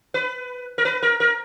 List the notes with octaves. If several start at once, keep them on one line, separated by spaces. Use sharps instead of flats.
B4
A#4
B4
A#4
A#4